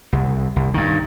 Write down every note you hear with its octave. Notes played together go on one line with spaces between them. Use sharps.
C2
C2
G2 D#3